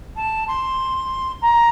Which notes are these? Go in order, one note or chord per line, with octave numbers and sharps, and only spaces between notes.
A5
C6
A#5